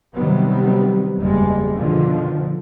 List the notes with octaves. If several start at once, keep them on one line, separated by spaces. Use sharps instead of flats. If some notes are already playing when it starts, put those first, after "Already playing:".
C3 D#3 F#3 G3 B3
F#1 E2 G3 G#3
B2 D3 D#3 F3